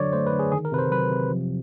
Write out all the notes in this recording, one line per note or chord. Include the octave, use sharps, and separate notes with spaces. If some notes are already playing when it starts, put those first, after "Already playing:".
Already playing: D3 F#3 C#5 D5
A3 C5
B4
D3
G#4
D#3 G#4
A#4
C3 B4
C5
F#3 B4
C3
F3